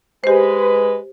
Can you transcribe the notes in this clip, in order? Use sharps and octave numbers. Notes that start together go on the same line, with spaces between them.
G#3 G4 B4 C5